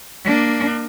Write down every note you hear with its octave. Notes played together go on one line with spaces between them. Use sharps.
A#3 D4